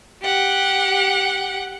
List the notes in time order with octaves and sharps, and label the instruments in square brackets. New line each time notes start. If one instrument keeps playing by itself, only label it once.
[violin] G4 F#5